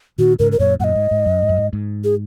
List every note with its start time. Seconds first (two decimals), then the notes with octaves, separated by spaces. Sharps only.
0.18 A#2 D#3 F#4
0.39 G#2 C#3 A#4
0.52 A#4
0.59 F#2 A#2 C#5
0.80 F#2 A#2 D#5 F#5
0.95 G#2
1.11 G#2
1.26 F#2
1.42 G#2
1.49 F#2
1.57 G#2
1.73 G#2
2.04 G#4